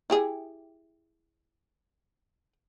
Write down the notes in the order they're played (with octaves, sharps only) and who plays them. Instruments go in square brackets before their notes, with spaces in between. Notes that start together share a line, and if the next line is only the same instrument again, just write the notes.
[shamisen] E4 G4 G#4